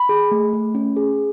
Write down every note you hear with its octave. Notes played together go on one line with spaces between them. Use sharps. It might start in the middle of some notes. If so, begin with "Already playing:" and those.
Already playing: B5
G#4
A3
A3
C#4
G#4